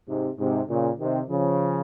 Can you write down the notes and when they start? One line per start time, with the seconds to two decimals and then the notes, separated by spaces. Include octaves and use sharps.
0.09 G#2 C3
0.39 G#2 C3
0.69 A#2 C#3
1.00 C3 D#3
1.30 C#3 F3